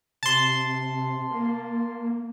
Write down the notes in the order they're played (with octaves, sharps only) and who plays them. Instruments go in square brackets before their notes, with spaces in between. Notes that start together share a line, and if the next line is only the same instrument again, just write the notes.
[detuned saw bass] C3 [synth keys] A5 C6
[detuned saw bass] A#3